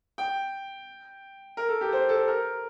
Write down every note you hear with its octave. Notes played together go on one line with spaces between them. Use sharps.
G5
A#4
A4
G4
C5
A4
A#4